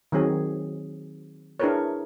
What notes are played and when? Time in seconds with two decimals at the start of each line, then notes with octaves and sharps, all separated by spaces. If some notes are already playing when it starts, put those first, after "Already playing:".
0.12 D#3 F#3 C4 G#4 C#5
1.59 D4 E4 G#4 A#4 B4 C#5